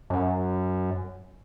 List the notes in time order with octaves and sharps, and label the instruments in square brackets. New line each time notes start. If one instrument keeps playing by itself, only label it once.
[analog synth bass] F#2